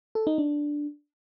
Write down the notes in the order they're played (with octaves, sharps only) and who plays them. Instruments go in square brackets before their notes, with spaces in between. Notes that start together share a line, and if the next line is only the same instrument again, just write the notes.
[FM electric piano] A4
D#4
D4